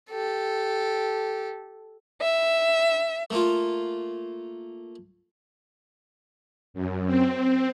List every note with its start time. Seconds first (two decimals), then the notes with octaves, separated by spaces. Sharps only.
0.10 G4 A4
2.21 E5
3.30 A3 A#3 F4
6.74 F#2
7.06 C4